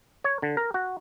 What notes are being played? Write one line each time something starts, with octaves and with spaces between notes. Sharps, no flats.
C#5
D3
A#4
F#4